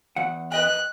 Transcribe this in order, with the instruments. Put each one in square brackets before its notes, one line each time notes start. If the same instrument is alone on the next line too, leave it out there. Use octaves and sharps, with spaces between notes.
[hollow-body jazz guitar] E2 F#5
[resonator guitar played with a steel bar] B4 D#5 G5 [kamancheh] F#6